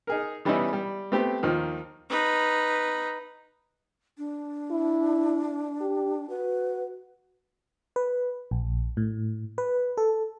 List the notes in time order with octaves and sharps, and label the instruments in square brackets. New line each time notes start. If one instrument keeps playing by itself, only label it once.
[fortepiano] D#4 G#4 A#4
E3 G3 B3 C#4 D#4 E4
G3
A3 B3 C4 G4
D#2 D#3 F3
[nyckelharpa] D#4 B4
[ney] D4
[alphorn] E4
G4
[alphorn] F#4 [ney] B4
[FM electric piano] B4
A#1
A2
B4
A4